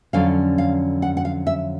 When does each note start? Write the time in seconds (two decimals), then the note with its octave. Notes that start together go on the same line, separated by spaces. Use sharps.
0.13 F2 D3 F#3 C#4 F5
0.58 F5
1.02 F#5
1.17 F#5
1.25 F5
1.47 E5